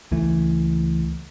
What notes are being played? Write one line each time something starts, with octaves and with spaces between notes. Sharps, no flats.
C#2 E3 A3